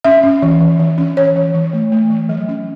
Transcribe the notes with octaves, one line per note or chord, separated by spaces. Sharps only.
C#4 E5
C#4
E3
E3
E3
C#4
E3 C#5
E3
E3
A3
A3
E3
F#3
C#4